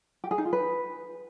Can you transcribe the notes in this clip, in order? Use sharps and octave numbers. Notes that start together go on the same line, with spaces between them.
G4
G#4
D#4
F4
B4